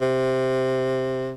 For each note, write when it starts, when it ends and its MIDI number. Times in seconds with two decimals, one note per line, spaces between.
0.01 1.35 48